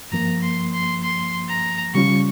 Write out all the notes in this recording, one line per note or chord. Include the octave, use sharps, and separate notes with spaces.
G2 F3 A#3 A#5
C6
C6
C6
A#5
C#3 G3 C#4 F4 C#6